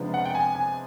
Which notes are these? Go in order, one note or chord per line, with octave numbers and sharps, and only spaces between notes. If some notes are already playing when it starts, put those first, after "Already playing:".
Already playing: C3 F3 G#3 B3 D4
F#5
G5
G#5
G#5